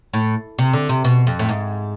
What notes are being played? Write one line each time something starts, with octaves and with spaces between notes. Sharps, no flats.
A2
C3
D3
C3
B2
F2
A2
G#2